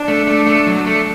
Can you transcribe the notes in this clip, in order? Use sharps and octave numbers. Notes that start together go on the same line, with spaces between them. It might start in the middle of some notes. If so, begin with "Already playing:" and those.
Already playing: D4
A3
A3
A3
F#3
A3